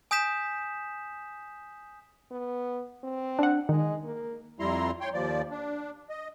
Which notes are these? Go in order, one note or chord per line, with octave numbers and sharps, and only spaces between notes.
G#5 D#6 G6 B6 E7
B3
C4
D4 F#5
D#3 G#3
A#3
F2 G3 E4 A#5 C6
C#5 G5 C6
D#2 F3 D5
D4
D#5